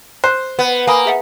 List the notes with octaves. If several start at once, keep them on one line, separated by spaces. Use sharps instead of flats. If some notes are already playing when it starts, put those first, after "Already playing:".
C5 F#6
B3
A#3 G#5 B5 D#6
G#4 E5 F#5